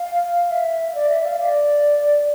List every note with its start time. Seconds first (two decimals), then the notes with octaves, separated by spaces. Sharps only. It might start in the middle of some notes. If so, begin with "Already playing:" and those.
Already playing: F5
0.51 E5
0.95 D5
1.10 E5
1.25 F5
1.40 D5